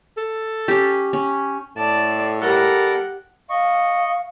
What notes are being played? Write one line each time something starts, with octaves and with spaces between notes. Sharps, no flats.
A4
C#4 G4
C#4
A2 A4 D5 A5
G3 G4 A4 A#4 F#5
D#5 F5 C#6